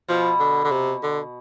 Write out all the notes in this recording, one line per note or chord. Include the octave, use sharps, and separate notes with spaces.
B2 F3
D3
D3
C3
D3